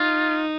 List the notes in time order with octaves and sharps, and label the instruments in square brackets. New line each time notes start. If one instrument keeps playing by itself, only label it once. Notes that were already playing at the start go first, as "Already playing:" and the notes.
Already playing: [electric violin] D#4 [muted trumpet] F4